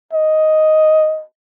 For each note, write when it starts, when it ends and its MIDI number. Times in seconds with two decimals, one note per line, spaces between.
0.13 1.23 75